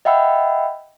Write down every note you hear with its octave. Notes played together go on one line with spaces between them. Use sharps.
D#5 E5 F#5 G5 B5 E6